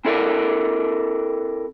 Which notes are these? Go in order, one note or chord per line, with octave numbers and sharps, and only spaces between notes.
C4 E4 A4 A#4 D5